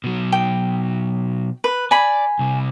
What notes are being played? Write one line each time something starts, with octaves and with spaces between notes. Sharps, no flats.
B2 F#3
G5
B4
D5 G#5 B5
C2 C3